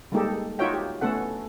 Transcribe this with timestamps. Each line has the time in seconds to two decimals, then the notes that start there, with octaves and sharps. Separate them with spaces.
0.12 G3 G#3 A#3 D#4 G4 A4
0.59 D#4 F4 F#4 C#5 E5 G5
0.74 G4
1.01 A3 B3 C#4 A4 F#5